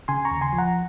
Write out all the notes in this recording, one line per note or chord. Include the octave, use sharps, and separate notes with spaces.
C#3 G#5 C6
A#5 C#6
D#2
G#5 C6
F3
F#5 A#5